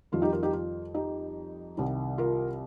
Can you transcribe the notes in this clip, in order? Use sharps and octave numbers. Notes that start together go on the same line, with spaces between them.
F2 D#3 G3 F4
D#4 G4
F4 A#4
D#4 G4
F4
D#4 G4
C2 C3 D#3 G3
F4 A#4